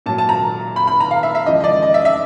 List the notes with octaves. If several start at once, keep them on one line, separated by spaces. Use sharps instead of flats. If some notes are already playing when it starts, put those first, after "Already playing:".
A#2 F#3 A5
A5
A#5
B5
B5
A#5
F5
E5
E5
E2 C#3 F3 G#3 D#5
D#5
D5
D#5
E5
E5